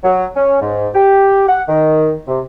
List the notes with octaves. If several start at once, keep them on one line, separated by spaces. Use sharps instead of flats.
F#3
C#4
G#2
G4
F#5
D#3
C3